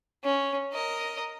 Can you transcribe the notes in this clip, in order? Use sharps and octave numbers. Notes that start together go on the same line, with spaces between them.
C#4
A#4 D#5